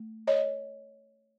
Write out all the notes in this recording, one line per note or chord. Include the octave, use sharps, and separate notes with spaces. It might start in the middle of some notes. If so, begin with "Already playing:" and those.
Already playing: A3
C#5 D#5